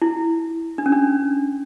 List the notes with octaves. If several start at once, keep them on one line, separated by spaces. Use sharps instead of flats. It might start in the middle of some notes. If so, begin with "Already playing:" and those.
E4
D4
C#4
D4